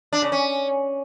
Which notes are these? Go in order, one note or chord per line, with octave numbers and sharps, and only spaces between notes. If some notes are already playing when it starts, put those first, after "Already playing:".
D4
C#3
C#4